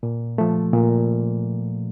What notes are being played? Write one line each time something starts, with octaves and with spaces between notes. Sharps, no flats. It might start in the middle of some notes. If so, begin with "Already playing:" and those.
A#2
F3 A3
A#2